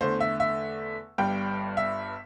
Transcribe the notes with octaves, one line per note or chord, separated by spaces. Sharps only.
E2 D3 A3 C5
E5
E5
G1 G2 G3 G5
E5